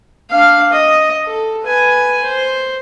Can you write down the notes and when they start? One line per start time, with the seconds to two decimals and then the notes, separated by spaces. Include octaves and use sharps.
0.31 D4 F5
0.73 D#5
1.27 A4
1.63 B4 G#5
2.24 C5